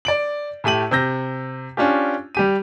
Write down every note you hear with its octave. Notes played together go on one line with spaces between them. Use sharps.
D5 D7 F#7
A2 A3 G4 D#7 F#7
C3 E6 G6 A#6
C#4 D4 F4 G4
G3 G4 D#7